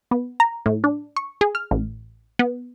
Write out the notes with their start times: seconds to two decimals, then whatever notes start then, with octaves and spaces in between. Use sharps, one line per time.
0.11 B3
0.40 A#5
0.66 A2
0.84 D4
1.17 C#6
1.41 G#4
1.55 F6
1.71 A1
2.39 B3